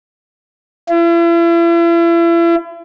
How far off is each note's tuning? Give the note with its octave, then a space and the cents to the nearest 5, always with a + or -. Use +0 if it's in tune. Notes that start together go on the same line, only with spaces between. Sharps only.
E4 +40